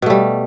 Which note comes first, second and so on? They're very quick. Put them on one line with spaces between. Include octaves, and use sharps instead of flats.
B2 A3 G3